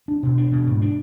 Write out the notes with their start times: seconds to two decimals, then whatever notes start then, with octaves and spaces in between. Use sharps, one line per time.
0.08 D4
0.23 B2
0.37 D4
0.52 B2
0.67 G#2
0.82 D4